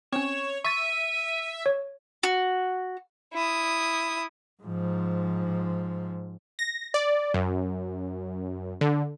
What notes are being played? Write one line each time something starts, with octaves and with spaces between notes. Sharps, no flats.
C4 C#4 C#5 E7
E5 C#6 A6 D#7
C#5
F#4
E4 D#6
G#2 F3
A#6
D5
F#2
D3